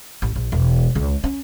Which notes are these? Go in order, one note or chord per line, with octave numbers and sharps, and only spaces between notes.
A1
A#1
E1
C#2
C#4